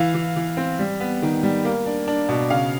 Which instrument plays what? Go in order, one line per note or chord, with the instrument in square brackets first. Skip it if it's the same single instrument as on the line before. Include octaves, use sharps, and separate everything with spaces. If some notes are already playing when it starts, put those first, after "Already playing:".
Already playing: [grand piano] E3 F5
E3
E3
C4
G3
B3
D#3
G3
A#3
D4
D4
B2
C#3 F5